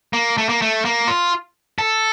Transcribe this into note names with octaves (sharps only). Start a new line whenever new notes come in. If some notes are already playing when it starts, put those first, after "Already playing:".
A#3
A3
A#3
A3
A#3
F4
A4